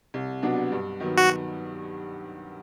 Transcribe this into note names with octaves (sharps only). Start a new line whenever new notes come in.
C2
B2 F#3 B3 D4
G2
D#3 F#3 B3
F#4